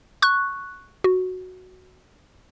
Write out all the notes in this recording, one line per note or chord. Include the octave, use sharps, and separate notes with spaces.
C#6 F#6
F#4